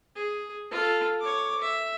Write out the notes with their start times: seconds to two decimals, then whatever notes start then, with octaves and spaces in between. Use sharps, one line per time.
0.15 G#4
0.71 F4 A4
1.20 C#5 D6
1.61 E5